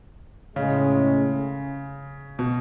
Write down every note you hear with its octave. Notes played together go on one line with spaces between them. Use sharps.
A2 C#3 G#3 C#4
B2